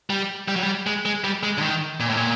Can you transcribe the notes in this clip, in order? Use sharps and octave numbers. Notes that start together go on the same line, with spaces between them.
G3
G3
F#3
G3
G#3
G#3
G3
G#3
D3
D#3
A#2
A2
A#2